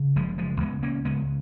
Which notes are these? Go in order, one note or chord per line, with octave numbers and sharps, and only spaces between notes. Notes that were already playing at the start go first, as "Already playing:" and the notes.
Already playing: C#3
F#1 F3 G#3
F3 G#3
C#2 G#3 B3
A#3 C#4
C#2 G#3 B3